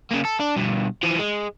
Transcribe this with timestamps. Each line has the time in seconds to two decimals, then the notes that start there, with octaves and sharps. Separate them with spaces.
0.11 C#3 A#3
0.25 A4
0.40 D4
0.56 G2 B2
1.03 E3 F3
1.19 G#3